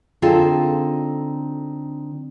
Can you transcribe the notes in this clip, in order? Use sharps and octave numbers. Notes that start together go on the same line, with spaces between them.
D3 C4 D#4 F4 G#4 A4